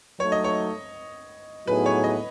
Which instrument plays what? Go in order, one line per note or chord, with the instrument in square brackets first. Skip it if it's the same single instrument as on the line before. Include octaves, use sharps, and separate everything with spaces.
[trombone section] F#3 A3 D#4 [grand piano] C#5
[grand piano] D#5
C#5
[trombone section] A2 F#3 B3 D#4 G#4 [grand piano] B4
[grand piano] C#5
D#5